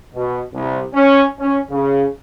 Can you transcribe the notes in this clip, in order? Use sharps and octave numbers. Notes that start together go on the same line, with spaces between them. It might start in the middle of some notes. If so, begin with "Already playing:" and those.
B2
C2
C#4
C#4
C#3